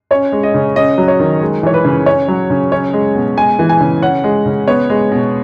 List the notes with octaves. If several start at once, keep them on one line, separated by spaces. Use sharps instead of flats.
C#4 C#5
G#3
D#5
C#3
C#4 D#5
F#3
C#5
D#3
G#3
E3 C#5
B4
C#3
C#4 C#5
F#3
C#3
C#4 C#5
G#3
B2
G#3 G#5
E3
G#5
C#3
C#4 F#5
G#3
C#3
B3 C#5
G#3
B2